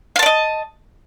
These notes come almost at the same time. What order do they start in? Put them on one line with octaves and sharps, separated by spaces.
F5 A5 D5 D#5